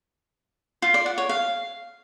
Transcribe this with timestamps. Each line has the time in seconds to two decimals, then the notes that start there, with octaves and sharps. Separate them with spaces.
0.82 F4
0.94 D5
1.06 F#5
1.18 C#5
1.29 F5